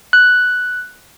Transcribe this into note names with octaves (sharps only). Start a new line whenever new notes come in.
F#6